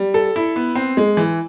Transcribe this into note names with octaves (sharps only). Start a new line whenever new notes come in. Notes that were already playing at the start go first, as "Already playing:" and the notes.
Already playing: G3
A4
E4
B3
C4
G#3
E3